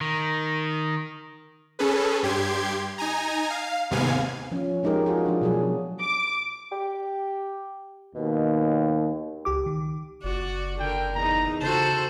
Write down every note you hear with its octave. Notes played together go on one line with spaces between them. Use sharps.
D#3
C#4 G#4 A4 B4
G2 G4 C6 G#6
D#4 G#5 A#5
F5
D#2 G#2 C3 B3 F5 G#5
F3 C#4
F3 G#3 D#4 G4 A#4
F4 F#4 G#4
F3 D4
B2 F#3 G#4
D6
G4
D#2 B2
C#2 G4 D6
D#3
F#1 F#4 D5
D3 A#4 G5
E2 D#4 A#5
C#3 F#4 A4 C5 A5